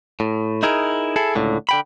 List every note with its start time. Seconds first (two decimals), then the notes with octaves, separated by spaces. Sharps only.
0.20 A2
0.63 D#4 E4 G#4 A#4
1.16 E4 G#4 A4
1.36 C#2 A2 D3
1.69 D3 G5 B5